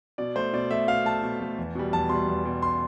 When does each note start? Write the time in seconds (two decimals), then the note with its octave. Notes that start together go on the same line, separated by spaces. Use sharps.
0.18 B2 D5
0.36 A3 C5
0.53 B2 D5
0.71 A3 E5
0.88 B2 F5
1.05 A3 A5
1.23 B2
1.41 A3
1.58 E2
1.75 B2 G3
1.93 E2 A5
2.09 B2 G3 C6
2.28 E2
2.44 B2 G3
2.62 C6